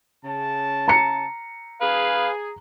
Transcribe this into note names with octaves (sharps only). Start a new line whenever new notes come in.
C#3 A5
A#5 C#7
G#4 B4 F5